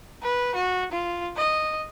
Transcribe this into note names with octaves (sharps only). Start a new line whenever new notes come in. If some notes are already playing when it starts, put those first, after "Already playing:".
B4
F#4
F4
D#5